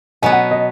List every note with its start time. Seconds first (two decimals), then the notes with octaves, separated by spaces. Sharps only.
0.22 B2 F#3 B3 G#5
0.32 F#5
0.51 D#5